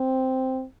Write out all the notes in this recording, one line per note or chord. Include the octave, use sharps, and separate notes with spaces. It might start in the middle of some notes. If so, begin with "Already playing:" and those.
Already playing: C4